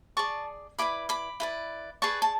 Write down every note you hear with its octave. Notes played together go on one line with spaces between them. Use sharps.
G#4 D5 A5 C#6
E4 B4 D5 B5 D6
B5 D6
E4 B4 D5
G#4 B4 D5 A5 C#6
A5